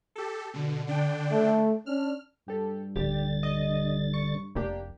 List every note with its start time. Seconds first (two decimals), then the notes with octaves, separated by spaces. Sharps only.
0.16 G4 A4
0.54 B2 D3
0.87 D3 D4 G5
1.31 A3
1.86 C#4 D4 F6
2.48 G2 G4 A4
2.96 D1 D3 G4 A6
3.43 D#5
4.14 C#6
4.55 F1 A#3 D4 G4